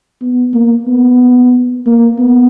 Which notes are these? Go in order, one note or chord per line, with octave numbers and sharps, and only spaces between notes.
B3
A#3
B3
A#3
B3